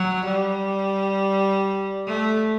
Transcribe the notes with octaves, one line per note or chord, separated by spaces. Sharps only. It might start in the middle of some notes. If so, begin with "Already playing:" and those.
Already playing: F#3
G3
A3